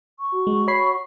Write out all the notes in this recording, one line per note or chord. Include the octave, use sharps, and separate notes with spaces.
C#6
F#4
G#3
C#5 B5 C7